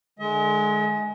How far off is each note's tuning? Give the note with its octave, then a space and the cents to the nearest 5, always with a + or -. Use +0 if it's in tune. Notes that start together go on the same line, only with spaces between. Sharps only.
D3 +40 G#3 +15 D#5 +45